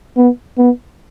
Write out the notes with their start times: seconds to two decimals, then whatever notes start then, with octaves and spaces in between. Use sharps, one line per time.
0.17 B3
0.57 B3